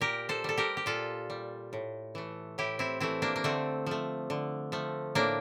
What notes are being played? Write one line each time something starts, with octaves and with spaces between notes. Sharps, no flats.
A#2 G4 A#4
A4 C5
G3 A4
G4 A#4
G4
A#2 F4 A4
G3
A2
E3 A3
A2 E4 G4
C4 E4
E3 A3 C4 E4
A#3 D4
A#3
D3 A3 C4
F3 A3
D3
F3 A3
A2 A#3 D4